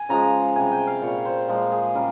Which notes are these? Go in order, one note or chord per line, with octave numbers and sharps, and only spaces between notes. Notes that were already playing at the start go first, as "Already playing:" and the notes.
Already playing: G#5
C#3 F3 G#3 A#5
C3 G3 G#5
G5
F5
A#2 G3 C#5
C5
A#2 F3 G#3 A#4
G#4
C#3 G3 A#4